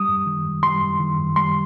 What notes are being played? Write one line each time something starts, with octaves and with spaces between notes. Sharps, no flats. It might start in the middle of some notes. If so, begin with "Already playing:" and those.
Already playing: G3 D#6
F#2
D#3
F#2
G3 C6
F#2
D#3
F#2
G3 C6